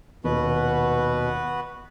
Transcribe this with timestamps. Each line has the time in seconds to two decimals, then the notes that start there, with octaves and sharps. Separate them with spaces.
0.24 D#1 B2 B3 F#4 B4